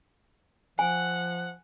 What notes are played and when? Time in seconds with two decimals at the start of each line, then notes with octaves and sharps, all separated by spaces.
0.79 F3 F#5 G#5